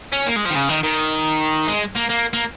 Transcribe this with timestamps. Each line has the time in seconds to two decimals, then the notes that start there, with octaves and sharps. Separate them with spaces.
0.12 C#4
0.27 A#3
0.36 G#3
0.45 F3
0.50 D#3
0.55 C#3
0.69 D#3
0.83 D#3
1.68 G#3
1.96 A#3
2.10 A#3
2.33 A#3